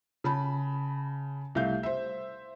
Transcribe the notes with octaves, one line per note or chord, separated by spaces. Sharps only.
C#3 A5 B5
C2 A3 F5 G6
C5 E5